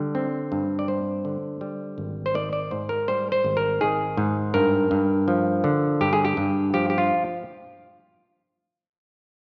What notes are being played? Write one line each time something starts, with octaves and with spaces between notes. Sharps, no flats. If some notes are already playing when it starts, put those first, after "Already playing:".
Already playing: D3 G3
C4
G2
D5
G3 C5
D3
G3
G#1
C5
D#3 D5
D5
G#2 C5
A#4
G3 C5
C5
G#1
A#4
D#3 G#4
G#2
G2 A#4
G2
F3
D3
G2 G4
G#4
G4
G2
F3 G4
G4
F4